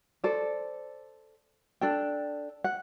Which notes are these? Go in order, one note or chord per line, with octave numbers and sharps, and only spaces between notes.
A4 C5 D5
D4 A4 G5
F#5